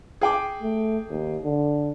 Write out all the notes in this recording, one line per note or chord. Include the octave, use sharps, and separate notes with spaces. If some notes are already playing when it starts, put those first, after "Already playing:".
G#4 G5 D6
A3
D#2
D3